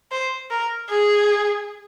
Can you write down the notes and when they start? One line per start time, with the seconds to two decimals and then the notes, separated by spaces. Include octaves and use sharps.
0.11 C5
0.51 A#4
0.89 G#4